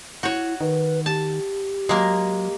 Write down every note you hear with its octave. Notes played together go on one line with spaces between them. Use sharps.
E4 F#4 C#5
D#3 B4
G4 A5
F#3 G#3 A#3